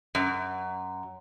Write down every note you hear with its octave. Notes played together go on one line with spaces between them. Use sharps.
F#2